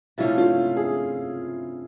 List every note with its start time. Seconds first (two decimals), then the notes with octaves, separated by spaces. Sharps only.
0.18 C3 F3 A3 C#4 E4
0.38 F4
0.77 G#4